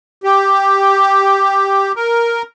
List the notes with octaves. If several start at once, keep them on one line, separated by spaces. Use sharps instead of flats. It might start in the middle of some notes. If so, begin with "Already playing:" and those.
G4
A#4